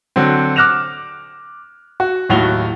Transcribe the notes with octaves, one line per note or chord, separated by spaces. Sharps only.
D3 F#3 C4
D6 F6 F#6 A#6 E7 F7
F#4
D#2 A2 F#3 F#4 F7 G7